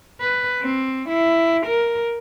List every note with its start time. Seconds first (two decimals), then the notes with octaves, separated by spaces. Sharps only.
0.21 B4
0.62 C4
1.09 E4
1.66 A#4